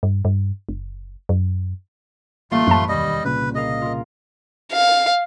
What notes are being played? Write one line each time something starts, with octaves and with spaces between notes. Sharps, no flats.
G2
G2
F#1
F#2
A1 G2 A3 A#3 F4 D5 C6
A1 F#2 B4 C#5 A5 B5
E1 D#2 G3 D#5
C2 A#2 C#3 B4
G#4 A#4 D#5 F5
F4 A#4
F5